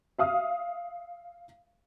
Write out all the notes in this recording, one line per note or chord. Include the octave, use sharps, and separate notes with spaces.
E5 F5 D#6 F6